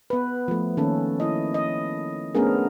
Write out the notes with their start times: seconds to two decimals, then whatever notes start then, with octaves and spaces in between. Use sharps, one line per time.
0.10 B3 B4
0.48 F3 A3
0.77 D#3 A#3 C#4 A4
1.20 E4 D#5
1.54 D#5
2.35 A3 B3 C#4 D4 G#4 A#4